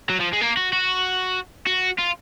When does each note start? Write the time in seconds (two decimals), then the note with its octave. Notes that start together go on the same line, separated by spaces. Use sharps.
0.10 F#3
0.20 F3
0.33 G#3
0.41 A#3
0.57 F#4
0.73 F#4
1.67 F#4
1.99 F4